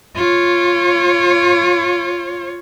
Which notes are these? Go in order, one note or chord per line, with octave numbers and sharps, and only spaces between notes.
F4 C#5